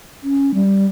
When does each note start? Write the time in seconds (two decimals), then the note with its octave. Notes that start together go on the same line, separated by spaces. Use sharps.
0.23 C#4
0.54 G3